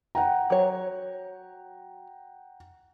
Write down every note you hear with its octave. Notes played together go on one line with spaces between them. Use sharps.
F#5 G5 A#5
F#3 C#5